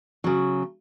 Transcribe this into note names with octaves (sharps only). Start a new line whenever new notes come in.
C#3 F#3